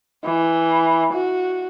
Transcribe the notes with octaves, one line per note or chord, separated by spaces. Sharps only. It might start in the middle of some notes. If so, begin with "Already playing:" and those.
E3
F#4